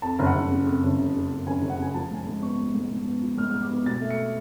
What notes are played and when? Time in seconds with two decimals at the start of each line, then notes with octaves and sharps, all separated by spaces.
0.02 F2 A5
0.19 F#1
0.26 F#5
0.35 F#1
0.51 C#3
0.67 F2
0.83 F#1
0.98 F#1
1.15 C#3
1.31 F2
1.47 F#1 G#5
1.62 F#1
1.69 F#5
1.79 C#3 G#5
1.94 F3 A5
2.11 G#2 G#5
2.18 A5
2.27 G#2
2.42 B3 C#6
2.58 F3
2.75 G#2
2.90 G#2
3.06 B3
3.22 F3
3.38 G#2 F6
3.51 G#2 F6
3.62 D6
3.70 B3
3.86 B2 A6
4.01 A3
4.11 C#7